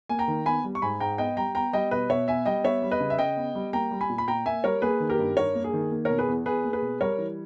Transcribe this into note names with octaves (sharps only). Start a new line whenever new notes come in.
A#3 G#5
G5 A#5
D#3
B3 G#5 B5
G3
C#6
G#2 G#5 B5
G#2 G5 A#5
B3 D#5 G5
G3 G5 A#5
B3 G5 A#5
G3 D#5 G5
B2 B4 D#5
B2 C#5 E5
B3 E5 G#5
G3 D#5 G5
B3 C#5 E5
G3
B4 D#5
C#3
E5
C#3 D#5 G5
B3
G3
A#3 G5 A#5
G3
G#5 B5
A#2
B5
A#2 G5 A#5
A#3 E5 G#5
G3 A#4 C#5
A#3 G#4 B4
D#3
G4 A#4
G2
G2 A#4 C#5
A#3
G#4
D#3
A#3
B2 A#4 C#5
G#4 B4
E2
E2 G#4 B4
A#3
G#4 B4
B2
G3 A#4 C#5
E3